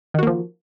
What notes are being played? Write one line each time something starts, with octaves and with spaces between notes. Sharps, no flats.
D#3 F3 A#3 F#4